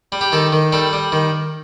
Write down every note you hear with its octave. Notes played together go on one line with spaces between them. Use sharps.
G3
G4
D#3 A4
D#3
G3 A4
G3
D#3